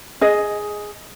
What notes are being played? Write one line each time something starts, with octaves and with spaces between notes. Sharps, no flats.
G#4 D#5